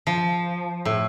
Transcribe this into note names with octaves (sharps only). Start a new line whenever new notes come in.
F3
A2